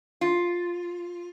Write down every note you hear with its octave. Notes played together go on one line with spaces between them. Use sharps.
F4